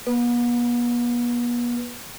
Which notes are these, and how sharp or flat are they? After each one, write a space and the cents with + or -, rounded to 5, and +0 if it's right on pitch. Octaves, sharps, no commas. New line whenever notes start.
B3 -45 B4 -10